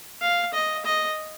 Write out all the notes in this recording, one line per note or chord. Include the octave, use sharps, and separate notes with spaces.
F5
D#5
D#5